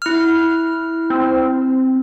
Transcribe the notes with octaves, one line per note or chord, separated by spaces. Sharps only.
E4 F6
C4